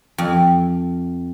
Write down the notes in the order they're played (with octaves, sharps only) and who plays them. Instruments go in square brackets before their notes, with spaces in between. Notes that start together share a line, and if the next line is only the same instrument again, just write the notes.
[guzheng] F2